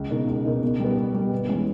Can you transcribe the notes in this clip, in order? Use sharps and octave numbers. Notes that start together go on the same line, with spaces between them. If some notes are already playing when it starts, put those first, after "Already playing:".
Already playing: C#2
B2 A#3 D#4
C#2
B2 A#3 D#4
B2
G3 B3
B2
G3 B3
G1
E3 G#3 C#4